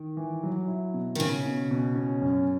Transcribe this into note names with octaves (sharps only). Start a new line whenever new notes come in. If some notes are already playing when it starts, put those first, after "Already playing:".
Already playing: D#3
E3
F#3
E4
B2
D#3
C#3 C#4
B2
B2
C#4
F#2